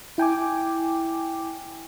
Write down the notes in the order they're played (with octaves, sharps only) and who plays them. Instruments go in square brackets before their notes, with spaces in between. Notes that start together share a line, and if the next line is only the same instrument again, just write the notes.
[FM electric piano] E4 G5 G#5 D6